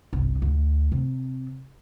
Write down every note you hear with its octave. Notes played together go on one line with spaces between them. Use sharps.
G1 C2
D2
C3